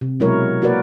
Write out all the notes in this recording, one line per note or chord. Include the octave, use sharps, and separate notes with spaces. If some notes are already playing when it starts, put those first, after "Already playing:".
C3
B2 F#3 G#3 E4 A#4 C#5
A#3 F#4 A#4 B4 D5